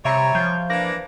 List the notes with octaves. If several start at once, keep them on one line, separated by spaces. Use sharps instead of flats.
C3 G3 C#5 E5 A#5
F3 G6
E3 A#3 D4 A#6